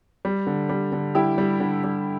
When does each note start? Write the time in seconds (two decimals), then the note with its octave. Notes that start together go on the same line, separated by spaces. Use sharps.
0.25 G3
0.47 D3
0.69 G3
0.92 D3
1.15 G3 E4 G4
1.38 G3
1.60 D3
1.84 G3